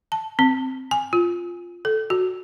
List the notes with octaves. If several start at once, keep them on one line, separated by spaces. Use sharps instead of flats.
A5
C4
G#5
F4
A4
F#4